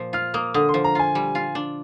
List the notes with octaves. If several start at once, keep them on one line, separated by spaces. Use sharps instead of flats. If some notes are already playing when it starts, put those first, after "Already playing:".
Already playing: A#2 F3
F4 F6
A#3 D#6
D3 D#6
C6
F3
A#5
F4 G#5
G3
F4
D4